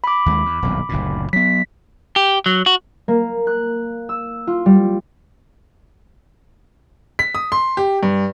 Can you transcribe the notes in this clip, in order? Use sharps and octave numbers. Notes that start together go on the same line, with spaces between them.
B5 D6
D#2 G3 G#3
E2
D#1 B1 F2
F#1 D2 A#2
F#3 B3 B6
G4
F#3
F#4
A#3
F#6
E6
F4
G3
B6
D#6
C6
G4
G2